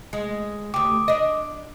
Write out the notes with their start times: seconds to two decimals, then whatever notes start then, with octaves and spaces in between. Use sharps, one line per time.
0.13 G#3
0.74 D2 G4 D6 D#6
1.08 D4 D#5